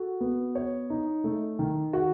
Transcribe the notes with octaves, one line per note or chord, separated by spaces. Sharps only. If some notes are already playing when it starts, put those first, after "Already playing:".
Already playing: F#4 A4
B3
C#5
D#4
A3
D#3
F#4